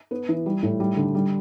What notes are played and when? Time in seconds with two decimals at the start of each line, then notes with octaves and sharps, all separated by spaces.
0.11 B3
0.29 E3
0.46 G3
0.63 A2
0.80 G3
0.97 D3
1.15 G3